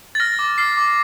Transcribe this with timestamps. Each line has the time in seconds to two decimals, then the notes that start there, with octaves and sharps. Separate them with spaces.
0.15 A6
0.20 F6 A#6
0.39 D6
0.58 F6 C7
0.77 D6